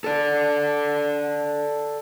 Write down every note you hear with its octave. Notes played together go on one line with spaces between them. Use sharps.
A4 D5